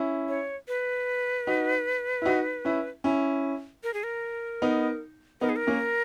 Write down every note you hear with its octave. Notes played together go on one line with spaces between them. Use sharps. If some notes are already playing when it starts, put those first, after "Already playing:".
Already playing: C#4 E4
C#5
B4
D#4 F#4
E4
D#4 F#4
C#4 E4
C#4 E4
A#4
G#4
A#4
B3 D#4
B3 D#4 A#4
G#4
A#4
A#3 C#4